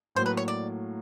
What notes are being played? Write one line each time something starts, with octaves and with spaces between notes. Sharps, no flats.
A2 F#3 A#3 C5
B4
C#5
D5